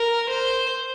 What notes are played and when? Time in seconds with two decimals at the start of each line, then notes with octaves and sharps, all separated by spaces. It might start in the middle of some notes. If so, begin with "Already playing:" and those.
Already playing: A#4
0.30 C5